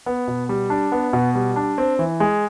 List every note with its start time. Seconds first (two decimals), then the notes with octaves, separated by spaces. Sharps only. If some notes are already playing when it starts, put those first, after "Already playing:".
0.06 B3
0.28 B2
0.49 G3
0.70 D4
0.92 B3
1.13 B2
1.35 G3
1.56 D4
1.78 C4
1.99 E3
2.20 G#3